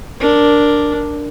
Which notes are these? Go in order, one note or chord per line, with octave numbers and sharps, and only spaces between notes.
D4 A#4